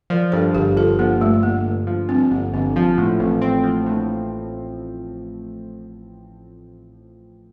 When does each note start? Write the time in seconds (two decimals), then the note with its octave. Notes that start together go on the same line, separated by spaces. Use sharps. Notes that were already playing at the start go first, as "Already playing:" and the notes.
0.10 F3 A#4 D5
0.32 G2 A4 C5
0.54 G1 G4 A#4
0.77 G1 F4 A4
0.99 F3 A#3
1.21 G2 A3
1.43 G1 A#3
1.65 G1
1.87 F3
2.09 G2 C4
2.31 G1 A#3
2.53 G1 C4
2.76 F3 C4
2.98 A2 A#3 D4
3.20 A1 C4
3.42 A#3 C4
3.64 F3 A#3
3.86 A2 A#3 D4